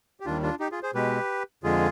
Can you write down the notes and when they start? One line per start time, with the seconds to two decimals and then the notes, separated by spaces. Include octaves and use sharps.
0.20 G4
0.25 D#2 D#3 G3 D4 F4
0.43 D4 F4
0.60 D#4 G4
0.72 F4 G#4
0.83 G#4 C5
0.94 B2 G#3 G4 B4
1.63 F2 D3 G#3 F4 G#4